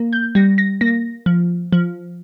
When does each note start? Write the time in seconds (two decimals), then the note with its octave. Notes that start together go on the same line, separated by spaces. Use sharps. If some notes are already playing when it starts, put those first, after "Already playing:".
Already playing: A#3
0.13 G6
0.35 G3 A#6
0.58 A#6
0.81 A#3 A#6
1.26 F3
1.73 F3